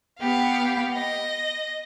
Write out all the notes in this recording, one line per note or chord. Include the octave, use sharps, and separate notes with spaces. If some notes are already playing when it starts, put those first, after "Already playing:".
B3 G4 F5
D#5